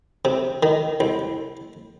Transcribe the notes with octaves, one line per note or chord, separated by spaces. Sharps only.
C3
D#3
C2